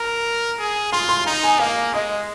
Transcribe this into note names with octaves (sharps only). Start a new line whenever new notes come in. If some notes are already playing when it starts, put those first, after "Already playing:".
Already playing: A#4 A#5
G#4
F4 C6
C6
D#4 A#5
G#5
A#3 F5
G#3 D#5